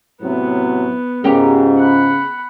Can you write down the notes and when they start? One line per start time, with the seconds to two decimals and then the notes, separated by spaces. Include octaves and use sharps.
0.21 A2 C3 F#3 B3
1.24 C#2 G#2 C#3 B3 C#4 G4 A#4
1.78 F#5 B5